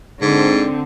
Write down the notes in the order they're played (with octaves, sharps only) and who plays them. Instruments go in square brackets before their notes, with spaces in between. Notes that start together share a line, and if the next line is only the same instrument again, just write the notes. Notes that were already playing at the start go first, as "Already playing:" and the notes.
[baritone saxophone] G#2 [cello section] D3 C4